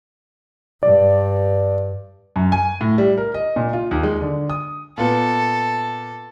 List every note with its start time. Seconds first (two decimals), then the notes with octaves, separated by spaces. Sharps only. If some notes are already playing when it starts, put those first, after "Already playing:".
0.83 G2 D5
2.36 F#2
2.52 G#5
2.81 A2
2.98 G3
3.18 A#4
3.34 D#5
3.56 A#2
3.73 F4
3.91 D#2
4.03 G#3
4.21 D3
4.50 D#6
4.98 A#2 B3 A4